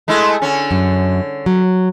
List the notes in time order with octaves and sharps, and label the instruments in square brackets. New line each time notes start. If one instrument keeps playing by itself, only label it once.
[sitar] G#3 A3 E4
D3 C#4
[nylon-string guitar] F#2
F#3